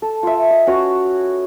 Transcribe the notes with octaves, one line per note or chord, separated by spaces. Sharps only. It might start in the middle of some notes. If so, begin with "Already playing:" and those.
A4
F4 E5
D#5
C#4 F#4 B4 C#5